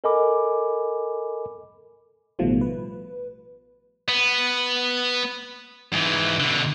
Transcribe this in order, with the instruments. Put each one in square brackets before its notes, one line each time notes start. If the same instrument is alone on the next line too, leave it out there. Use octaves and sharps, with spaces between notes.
[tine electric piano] A4 A#4 D#5 G#5 B5 D6
[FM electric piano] A1 B2 D#3 F3 G3 A3
B4
[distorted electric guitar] B3
G#2 E3
B2 D3